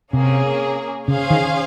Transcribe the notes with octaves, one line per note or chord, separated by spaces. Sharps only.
C3 A#3 C#4 G#4
C#3 C#4 G#4 C5 F5
D#3